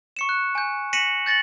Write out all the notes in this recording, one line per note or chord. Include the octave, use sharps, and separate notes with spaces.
C#6 C#7 E7
F#6
G#5 G6
A#6 B6 C#7 D#7 E7 F#7
G6 A6 A#6 C#7 F#7